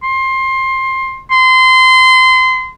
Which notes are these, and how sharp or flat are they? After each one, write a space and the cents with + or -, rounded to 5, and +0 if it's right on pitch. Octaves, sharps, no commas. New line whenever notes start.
C6 +20
C6 -25